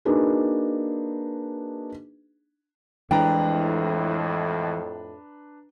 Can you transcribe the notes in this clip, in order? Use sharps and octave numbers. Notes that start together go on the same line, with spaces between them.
A#3 D4 D#4 F#4 G#4 B4
F2 A2 E3 G#3 D4 B4 G5 A#5